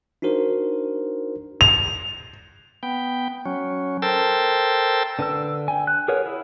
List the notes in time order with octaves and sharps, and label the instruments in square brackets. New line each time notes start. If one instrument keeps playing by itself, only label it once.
[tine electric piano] D4 D#4 F#4 A#4 C5
[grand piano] F7
[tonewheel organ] B3 G5
F#3 C#4
A4 A#4 C5 G5 A5 E6
[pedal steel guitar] D3 B4 E6
G5 G#5
F#6
G#4 A#4 B4 C#5 F#5
E4